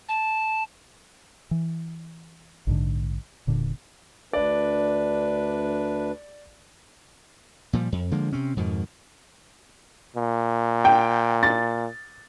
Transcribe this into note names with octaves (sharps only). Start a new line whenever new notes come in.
A5
E3
A#1 G#2 D3
E1 A#2 D3
D2 D4 B4 D5
A#2 F3 G3
F2
D3 F3 G#3 A#3
C3 C4 C#4
F2 G#2 B2 D#3
A#2
G5
A6